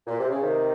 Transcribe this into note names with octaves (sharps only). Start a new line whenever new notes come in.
A#2
C3
C#3
C3 D#3